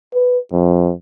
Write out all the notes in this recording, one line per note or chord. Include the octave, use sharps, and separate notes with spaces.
B4
F2